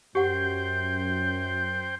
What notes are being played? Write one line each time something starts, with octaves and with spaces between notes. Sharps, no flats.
F#2 G4 C5 F#5 G5